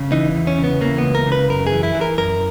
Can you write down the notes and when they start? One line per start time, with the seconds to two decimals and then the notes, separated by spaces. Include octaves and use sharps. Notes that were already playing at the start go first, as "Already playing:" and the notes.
Already playing: C#3
0.12 E3 D#4
0.35 E2
0.47 C#4
0.58 C#3
0.64 B3
0.81 E3 A#3
0.98 C#2 B3
1.15 A#4
1.27 C#3 B4
1.49 F#2 A#4
1.67 G#4
1.72 E3
1.83 E4
1.95 E3
2.01 A#4
2.18 F#2 A#4